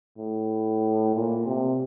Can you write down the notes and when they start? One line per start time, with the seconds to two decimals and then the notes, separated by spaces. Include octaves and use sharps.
0.18 A2
1.14 A#2
1.46 C3